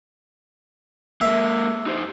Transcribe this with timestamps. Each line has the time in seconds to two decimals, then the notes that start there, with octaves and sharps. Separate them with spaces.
1.21 G#3 A#3 E5
1.86 D#4 G4 C5